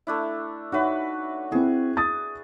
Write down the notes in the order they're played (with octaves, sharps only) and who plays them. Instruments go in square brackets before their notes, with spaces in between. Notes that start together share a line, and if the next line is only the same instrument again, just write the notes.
[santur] A3 D4 E4
[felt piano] D#4 C#5 E5 [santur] F#4 B4
[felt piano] C4 E4 [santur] G#4
[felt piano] D#6 A6